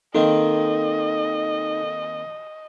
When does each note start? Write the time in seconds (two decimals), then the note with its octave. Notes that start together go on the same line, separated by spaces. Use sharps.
0.15 D#3 A#3 C4 D#4 A4 D#5 G5